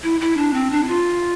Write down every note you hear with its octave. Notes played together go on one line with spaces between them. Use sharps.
E4
E4
D4
C4
D4
E4
F4